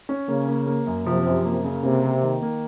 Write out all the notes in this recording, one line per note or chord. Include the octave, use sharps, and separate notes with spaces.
C#4
C#3 A#3
A#3
A#3
F#2
C3 F3
F#2
A#3
C#3
C3 A#3
A#3
D#3
A#3